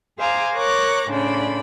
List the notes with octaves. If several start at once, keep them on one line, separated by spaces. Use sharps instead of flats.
G#4 C5 F5 G#5 A#5 D6
A#4 C#5 A#5 C#6 D6 F#6
A2 C#3 D4 C5 D5 B5